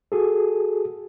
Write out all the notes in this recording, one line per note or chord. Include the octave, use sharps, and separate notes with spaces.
F#4 G#4 A4